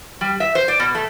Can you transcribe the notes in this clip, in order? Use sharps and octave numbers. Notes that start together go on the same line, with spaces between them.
G3
E5
C5
D5
B2
A3